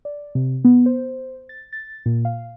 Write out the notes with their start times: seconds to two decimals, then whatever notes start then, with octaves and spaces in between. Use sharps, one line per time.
0.05 D5
0.35 C3
0.64 B3
0.86 C5
1.49 A6
1.73 A6
2.06 A#2
2.25 F5